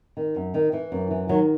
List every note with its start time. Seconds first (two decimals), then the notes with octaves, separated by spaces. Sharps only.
0.17 D#3
0.36 F#2
0.54 D#3
0.73 E3
0.92 F#2
1.11 E3
1.29 D#3 F#3